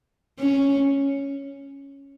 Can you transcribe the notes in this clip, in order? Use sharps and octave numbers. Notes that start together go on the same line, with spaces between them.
C#4